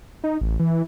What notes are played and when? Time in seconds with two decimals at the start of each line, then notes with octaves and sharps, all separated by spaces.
0.24 D#4
0.41 A1
0.60 E3